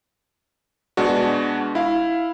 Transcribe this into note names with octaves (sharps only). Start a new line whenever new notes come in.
B2 G#3 D4 F#4
E4 F5